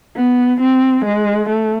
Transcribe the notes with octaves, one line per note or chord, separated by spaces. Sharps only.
B3
C4
G#3
A3